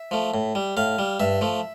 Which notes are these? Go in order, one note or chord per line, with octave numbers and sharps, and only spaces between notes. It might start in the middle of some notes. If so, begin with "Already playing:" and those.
Already playing: E5
F3 A3
A2
G3
A2 F5
G3
G2 E5
F3 A3